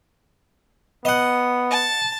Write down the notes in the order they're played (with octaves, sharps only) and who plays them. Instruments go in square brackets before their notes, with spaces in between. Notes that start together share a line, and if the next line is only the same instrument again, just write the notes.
[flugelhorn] B3 [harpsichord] D#5 F#5
[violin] A5